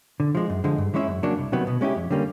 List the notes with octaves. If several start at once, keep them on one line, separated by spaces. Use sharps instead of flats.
D3
F3 G#3
F#2
D3 F3 G#3
G2
E3 G#3 C#4 E4
F#2
C#3 F#3 A#3 D4
C2
C3 D#3 F#3 B3
B2
G#3 C#4 E4 G4
F2
D3 G3 A#3 C#4